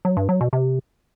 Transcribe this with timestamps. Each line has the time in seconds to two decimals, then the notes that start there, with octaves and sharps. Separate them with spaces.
0.05 F#3
0.17 G2
0.29 F#3
0.41 B2
0.53 C3